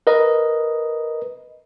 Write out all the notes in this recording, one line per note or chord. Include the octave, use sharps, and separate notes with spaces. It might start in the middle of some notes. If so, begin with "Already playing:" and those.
A#4 B4 D#5